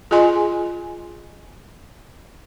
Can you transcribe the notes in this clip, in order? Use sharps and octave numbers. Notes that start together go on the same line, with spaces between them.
F4 G#4 D#5 G#5 C6